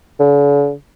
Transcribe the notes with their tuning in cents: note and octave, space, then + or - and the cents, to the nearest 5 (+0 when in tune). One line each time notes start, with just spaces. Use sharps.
D3 -45